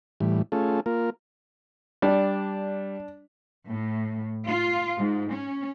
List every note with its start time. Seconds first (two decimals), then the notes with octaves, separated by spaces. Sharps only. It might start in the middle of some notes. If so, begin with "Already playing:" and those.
0.21 A2 E3 G3
0.52 A3 C#4 F4 G#4 A4
0.86 A#3 F4 A#4
2.02 G3 D4
3.69 A2
4.46 F4
4.97 G#2
5.32 C#4